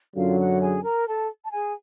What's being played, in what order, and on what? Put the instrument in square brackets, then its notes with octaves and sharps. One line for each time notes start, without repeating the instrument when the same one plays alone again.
[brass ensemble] F#2 D3 F#3 [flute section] F4 F5
[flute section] F#4 F#5
G#4 G#5
A#4 A#5
A4 A5
A5
G#4 G#5